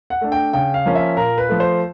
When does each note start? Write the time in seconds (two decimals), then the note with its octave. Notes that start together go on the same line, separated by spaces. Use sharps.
0.10 F#5
0.21 A3 D4
0.32 G5
0.53 C#3 G5
0.74 F5
0.86 F3 A#3 C#4
0.95 E5
1.17 A#2 A#4
1.38 B4
1.49 F3 A3
1.60 C5